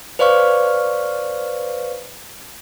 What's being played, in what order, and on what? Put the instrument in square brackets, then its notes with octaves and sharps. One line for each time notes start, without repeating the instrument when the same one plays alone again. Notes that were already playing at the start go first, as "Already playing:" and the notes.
[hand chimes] B4 C5 D5 F5 C#6 F6